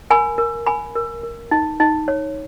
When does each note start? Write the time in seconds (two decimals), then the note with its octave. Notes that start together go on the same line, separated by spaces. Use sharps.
0.10 A#4 G#5 B5
0.38 A#4
0.67 A#4 G#5 B5
0.95 A#4
1.23 A#4
1.51 D#4
1.80 D#4
2.08 C#5